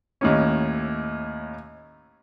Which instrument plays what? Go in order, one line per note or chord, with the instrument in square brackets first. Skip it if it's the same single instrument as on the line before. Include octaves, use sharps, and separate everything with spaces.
[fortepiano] D#2 A2 C#4